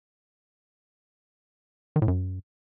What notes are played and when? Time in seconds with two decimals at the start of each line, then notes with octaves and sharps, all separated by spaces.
1.96 D#3
2.02 A2
2.08 F#2